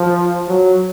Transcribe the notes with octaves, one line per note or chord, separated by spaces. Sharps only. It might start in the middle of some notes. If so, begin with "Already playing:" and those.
Already playing: F3
F#3